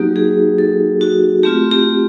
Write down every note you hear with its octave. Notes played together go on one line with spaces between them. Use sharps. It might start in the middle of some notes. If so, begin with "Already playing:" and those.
Already playing: F#3 A#3 D#4 F#4 G4
G#4
A4
F#4
A3 C4 F4 G4
G4